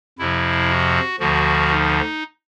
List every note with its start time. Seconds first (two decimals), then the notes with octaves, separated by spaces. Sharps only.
0.19 F2 C3 F3 E4
0.70 F#4
1.19 D2 D3 F3 F#4
1.71 D#4